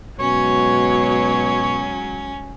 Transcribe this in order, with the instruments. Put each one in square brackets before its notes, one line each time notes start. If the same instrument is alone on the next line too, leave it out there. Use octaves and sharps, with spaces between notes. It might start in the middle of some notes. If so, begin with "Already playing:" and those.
[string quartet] G#2 F#3 [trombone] B2 [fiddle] C#4 [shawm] C#5